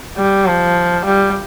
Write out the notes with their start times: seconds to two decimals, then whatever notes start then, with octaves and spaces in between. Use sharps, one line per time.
0.17 G3
0.47 F3
1.05 G3